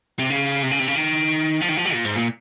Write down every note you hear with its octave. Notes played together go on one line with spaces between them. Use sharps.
C3
C#3
C3
C#3
C3
C#3
D#3
F3
D#3
F3
F#3
A#2
G#2
A#2